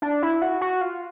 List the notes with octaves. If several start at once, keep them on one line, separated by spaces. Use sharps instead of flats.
D4
E4
F#4
F#4
F4